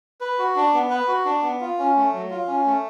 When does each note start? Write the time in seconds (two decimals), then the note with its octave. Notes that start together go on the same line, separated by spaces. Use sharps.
0.21 B4
0.39 F#4
0.56 D4
0.73 B3
0.90 B4
1.08 F#4
1.25 D4
1.43 B3
1.61 F4
1.79 C#4
1.96 A3
2.13 F#3
2.31 F4
2.47 C#4
2.66 A3